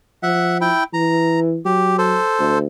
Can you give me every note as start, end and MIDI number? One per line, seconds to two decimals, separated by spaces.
0.23 0.72 53
0.23 0.58 76
0.23 0.58 78
0.61 0.84 64
0.61 0.84 79
0.94 1.58 52
0.94 1.40 82
1.65 2.18 54
1.65 1.97 67
1.98 2.59 69
1.98 2.59 72
2.39 2.66 38